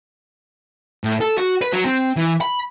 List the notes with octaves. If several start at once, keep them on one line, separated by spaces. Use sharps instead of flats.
A2
A4
F#4
B4
F#3
C4
E3
B5